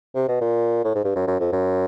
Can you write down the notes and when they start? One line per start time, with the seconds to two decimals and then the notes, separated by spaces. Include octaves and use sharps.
0.15 C3
0.28 B2
0.41 A#2
0.84 A2
0.95 G#2
1.04 G2
1.15 F#2
1.27 F#2
1.40 F2
1.52 F#2